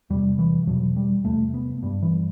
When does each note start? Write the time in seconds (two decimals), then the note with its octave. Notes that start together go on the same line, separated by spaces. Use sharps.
0.10 E2 C3 G3
0.39 E3
0.67 E2 B2 F#3
0.96 G3
1.25 E2 C3 A3
1.54 B3
1.83 G2 G3
2.02 E3